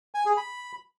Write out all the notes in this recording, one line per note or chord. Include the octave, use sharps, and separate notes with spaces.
G#5
G#4
B5